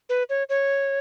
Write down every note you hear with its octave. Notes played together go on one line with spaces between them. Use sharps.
B4
C#5
C#5